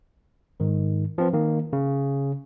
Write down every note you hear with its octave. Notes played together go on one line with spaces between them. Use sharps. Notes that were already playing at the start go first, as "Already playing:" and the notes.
G#2 D#3
F3 C4 B4
D#3 A#3
C#3